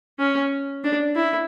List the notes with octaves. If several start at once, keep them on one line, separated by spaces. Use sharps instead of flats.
C#4
D4
E4